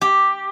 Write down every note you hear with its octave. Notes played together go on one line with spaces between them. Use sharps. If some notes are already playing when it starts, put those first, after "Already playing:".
G4